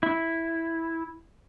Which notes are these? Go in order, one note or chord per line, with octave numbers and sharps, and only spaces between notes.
E4